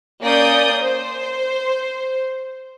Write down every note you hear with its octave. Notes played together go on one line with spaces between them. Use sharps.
A#3 C#4 D5 D#6 G6
C5